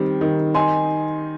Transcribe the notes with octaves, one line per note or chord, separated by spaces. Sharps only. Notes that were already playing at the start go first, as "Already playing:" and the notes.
Already playing: D#3 G3 C4
D#3
D#4 G#5 C6